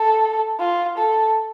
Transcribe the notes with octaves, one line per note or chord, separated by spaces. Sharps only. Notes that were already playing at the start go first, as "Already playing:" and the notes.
Already playing: A4
F4
A4